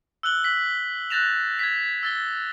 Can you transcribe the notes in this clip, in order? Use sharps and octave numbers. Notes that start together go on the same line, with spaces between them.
E6 F#6 F#7 G7
B6 F#7
F#6 G6 A6 A#6 E7 F7
G#6 A#6 B6
E6 A6 G7